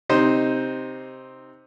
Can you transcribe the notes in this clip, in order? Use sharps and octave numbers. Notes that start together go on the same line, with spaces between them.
C3 D#4 C5